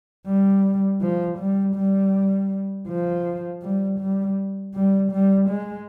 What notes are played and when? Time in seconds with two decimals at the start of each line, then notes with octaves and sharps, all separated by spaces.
0.26 G3
1.01 F3
1.38 G3
1.75 G3
2.88 F3
3.62 G3
4.00 G3
4.74 G3
5.12 G3
5.49 G#3